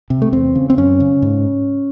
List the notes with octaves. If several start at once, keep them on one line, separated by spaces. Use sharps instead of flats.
C3
A3
E2 C4
C#3
C4
F#2 C#4
C#3
G#2